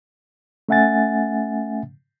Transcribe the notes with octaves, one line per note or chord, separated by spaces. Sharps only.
A3 C#4 E5 F#5 G#5 A6